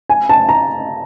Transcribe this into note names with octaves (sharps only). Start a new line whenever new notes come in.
G#5
A5
A#5